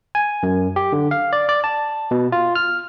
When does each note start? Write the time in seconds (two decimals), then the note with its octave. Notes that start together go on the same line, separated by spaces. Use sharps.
0.15 G#5
0.43 F#2
0.76 G4
0.93 D3
1.11 F5
1.33 D5
1.49 D5
1.64 A5
2.11 B2
2.32 F4
2.55 F6